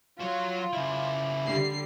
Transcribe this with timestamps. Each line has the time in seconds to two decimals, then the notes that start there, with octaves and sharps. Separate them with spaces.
0.20 F#3 F4 C#5
0.73 C#3 E4
1.46 D3 G3 C7